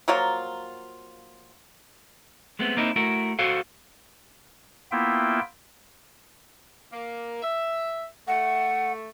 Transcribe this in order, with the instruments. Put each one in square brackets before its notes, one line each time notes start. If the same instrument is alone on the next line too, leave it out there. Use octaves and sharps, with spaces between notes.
[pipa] F3 F#3 A#3 F4
[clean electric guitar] G#3 A3 B3 C4
A#3 C4 D#4 E4
A3 E4 F#4 A#4
F#4 A4 C5 F5
[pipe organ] A#3 B3 E4 F4 E5 G5
[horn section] A#3
E5
[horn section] A3 [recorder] F#5